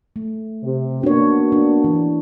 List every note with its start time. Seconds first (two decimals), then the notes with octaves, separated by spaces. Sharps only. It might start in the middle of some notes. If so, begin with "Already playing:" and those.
0.16 A3
0.62 C3
1.03 A#3 B3 D4 F#4 C#5
1.52 D4
1.84 E3